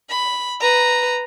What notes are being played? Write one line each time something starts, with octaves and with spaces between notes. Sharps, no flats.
B5
B4 A#5